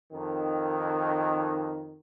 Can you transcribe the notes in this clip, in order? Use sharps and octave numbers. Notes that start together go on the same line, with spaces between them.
F2 D#3